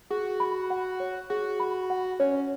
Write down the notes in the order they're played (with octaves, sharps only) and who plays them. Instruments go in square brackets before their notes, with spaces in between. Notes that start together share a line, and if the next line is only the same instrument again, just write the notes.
[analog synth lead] F#4 [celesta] G#4
[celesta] B5
F#5
C#5
[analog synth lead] F#4 [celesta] G#4
[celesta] B5
F#5
[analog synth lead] C#4 [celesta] C#5